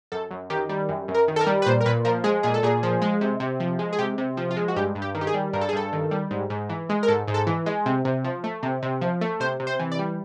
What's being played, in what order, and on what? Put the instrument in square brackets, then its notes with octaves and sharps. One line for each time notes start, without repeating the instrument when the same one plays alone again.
[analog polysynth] F#2 A4
F#2
D#3 G4
G3
F#2
F#2
A#4
D#3
A4
A#4
G3
B4
A#2 C5
A#4
A#2 B4
F3 A#4
G#3 G#4
A#2 G#4
A4
A#2 G#4
F3
G#3
C3
C3
F3
G#3
G#4
C3 G4
C3
F3
F4
G#3
F#4
G2 G4
G2
G4
D#3
G4
G#4
G3
G2 A#4
A4
G#4
G2 A4
D#3
G3
G#2
G#2
E3
G#3
A#4
G#2 A4
G#2
A4
E3
G#3
C3
C3
F3
A3
C3
C3
F3
A3
C3 C5
C3
C5
E3
D5
G3